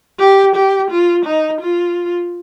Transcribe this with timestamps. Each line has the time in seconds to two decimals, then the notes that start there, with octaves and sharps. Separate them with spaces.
0.20 G4
0.56 G4
0.91 F4
1.26 D#4
1.61 F4